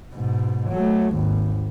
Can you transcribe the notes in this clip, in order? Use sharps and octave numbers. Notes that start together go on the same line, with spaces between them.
G#2 B2
F#3 A3
G#1 D#2